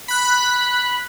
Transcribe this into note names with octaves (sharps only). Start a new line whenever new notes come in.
B5 F#6